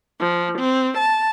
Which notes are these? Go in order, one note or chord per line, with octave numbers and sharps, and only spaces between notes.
F3
C4
A5